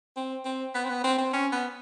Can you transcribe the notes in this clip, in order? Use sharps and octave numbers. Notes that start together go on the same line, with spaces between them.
C4
C4
B3
C4
B3
C4
C4
C#4
B3